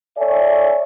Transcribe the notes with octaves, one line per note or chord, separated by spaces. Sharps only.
A4 C#5 D5 E5 G#5